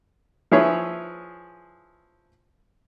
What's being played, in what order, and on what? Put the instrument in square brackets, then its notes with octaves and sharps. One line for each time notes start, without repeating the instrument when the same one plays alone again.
[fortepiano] F3 E4 G#4 B4 C#5